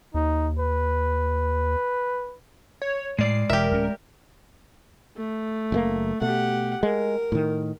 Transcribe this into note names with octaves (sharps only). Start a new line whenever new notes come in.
D#2 D#4
B4
C#5
A2 G#3 A3 D5 C7
E1 G4 A#4 E5
D1 C#4
A3
F#1 A#2 A#3
B2 A3 G4 F#5
G#3 A#4
A2 D#3